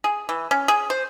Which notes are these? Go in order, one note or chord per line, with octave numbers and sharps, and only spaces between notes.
G#4
E3
C#4
G#4
C5